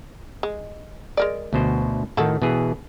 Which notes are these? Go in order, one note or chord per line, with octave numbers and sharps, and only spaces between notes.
G#3
G#3 A#4 D5
D2 B2 C5
A2 D#3 E4 F#4 A4
B2 E3 G#4